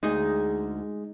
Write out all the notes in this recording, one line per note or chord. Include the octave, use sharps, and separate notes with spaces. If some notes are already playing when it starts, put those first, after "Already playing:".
D2 G#3 D#4 G#4 D#5